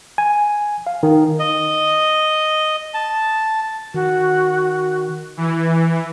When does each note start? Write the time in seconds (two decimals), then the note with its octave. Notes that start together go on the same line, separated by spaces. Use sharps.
0.18 G#5
0.87 F5
1.03 D#3
1.40 D#5
2.94 A5
3.94 D#3 F#4
5.37 E3